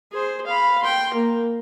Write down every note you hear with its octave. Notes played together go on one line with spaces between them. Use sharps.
G#4 C5
F5 B5
G5 C6
A#3